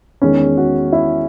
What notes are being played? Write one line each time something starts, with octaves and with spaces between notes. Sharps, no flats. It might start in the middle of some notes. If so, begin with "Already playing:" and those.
E2 D#3 G#3 C#4
F#4
E4